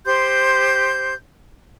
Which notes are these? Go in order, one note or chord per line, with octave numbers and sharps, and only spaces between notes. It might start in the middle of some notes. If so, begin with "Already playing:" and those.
G4 C5 C6 G6